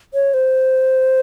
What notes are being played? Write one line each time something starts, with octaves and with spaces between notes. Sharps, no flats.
C#5
C5